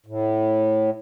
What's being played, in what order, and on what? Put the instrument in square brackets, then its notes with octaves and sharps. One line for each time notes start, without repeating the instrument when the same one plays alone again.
[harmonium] A2